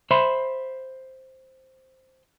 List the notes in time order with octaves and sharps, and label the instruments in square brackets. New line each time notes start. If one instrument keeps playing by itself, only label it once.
[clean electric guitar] C5 E5 B5 C6